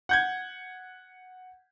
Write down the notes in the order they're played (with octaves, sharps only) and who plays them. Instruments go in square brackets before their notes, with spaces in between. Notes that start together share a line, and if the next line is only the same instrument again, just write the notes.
[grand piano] F#5 G6 G#6